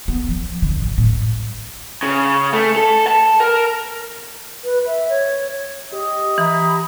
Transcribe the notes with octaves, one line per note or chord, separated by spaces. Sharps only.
B3
F3
D3
G#1
A2
G3
C#3
A3
A4
A5
A#4
B4
E5
C#5
G4 D#5
E3 A#5 B5 D#6